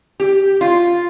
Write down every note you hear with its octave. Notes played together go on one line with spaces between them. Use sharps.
G4
F4